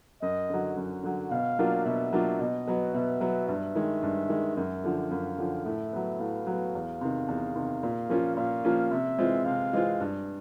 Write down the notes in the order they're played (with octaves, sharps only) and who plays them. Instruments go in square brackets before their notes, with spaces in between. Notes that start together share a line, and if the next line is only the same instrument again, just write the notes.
[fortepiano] F#2 [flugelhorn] D#5
[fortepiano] D3 F#3
F#2
D3 F#3
[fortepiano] B2 [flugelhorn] F5
[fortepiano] F#3 A#3 D4 F4
[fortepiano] B2 [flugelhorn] E5
[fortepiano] F#3 A#3 D4 F4
[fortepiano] B2 [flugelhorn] D#5
[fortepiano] F#3 B3
[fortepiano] B2 [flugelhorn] E5
[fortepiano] F#3 B3
[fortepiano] G2 [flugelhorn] E5
[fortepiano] D#3 G#3
G2
D#3 G#3
[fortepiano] F#2 [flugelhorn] E5
[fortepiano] D3 F3
[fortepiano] F#2 [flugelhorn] F5
[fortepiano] D3 F3
[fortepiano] A2 [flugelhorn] E5
[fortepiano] F#3 B3
[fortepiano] A2 [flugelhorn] F5
[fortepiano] F#3 B3
E2
C3 D#3
E2
C3 D#3
A#2
F3 A#3 C#4 F4
[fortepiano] A#2 [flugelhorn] F5
[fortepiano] F3 A#3 C#4 F4
[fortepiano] C3 [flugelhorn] E5
[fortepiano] E3 G#3 C4 F4
[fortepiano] C3 [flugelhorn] F5
[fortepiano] E3 G#3 C4 F4
G2